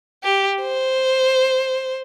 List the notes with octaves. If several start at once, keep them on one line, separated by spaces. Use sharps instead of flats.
G4
C5